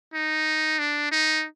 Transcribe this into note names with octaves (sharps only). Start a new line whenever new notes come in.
D#4
D4
D#4